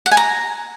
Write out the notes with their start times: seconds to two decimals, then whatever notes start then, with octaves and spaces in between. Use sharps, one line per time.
0.06 F#5
0.11 G#5
0.17 A#5